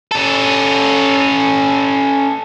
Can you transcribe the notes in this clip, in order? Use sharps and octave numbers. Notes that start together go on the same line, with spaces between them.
C#4 A4